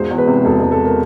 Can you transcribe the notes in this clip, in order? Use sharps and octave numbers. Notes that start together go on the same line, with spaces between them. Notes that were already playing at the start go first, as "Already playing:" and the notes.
Already playing: E1 G#2 C5
E2
B4
C3
E1 A4
A4
E1
A4
A#4